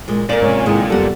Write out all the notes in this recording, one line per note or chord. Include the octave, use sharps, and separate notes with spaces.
A#2 G#3
A#2 A#4 D5
G#2 C3 C#4
A2 D#3 G#3
F1 F#2 G3 B3 A4 F#5